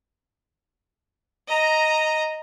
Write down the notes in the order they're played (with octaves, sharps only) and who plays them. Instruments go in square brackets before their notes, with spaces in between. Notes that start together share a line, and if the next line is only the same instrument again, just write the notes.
[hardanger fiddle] D#5 A#5